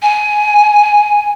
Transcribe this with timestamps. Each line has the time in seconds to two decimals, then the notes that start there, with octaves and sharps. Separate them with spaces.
0.02 G#5